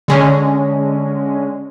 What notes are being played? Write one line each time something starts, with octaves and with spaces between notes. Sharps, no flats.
D3 G#3 C#4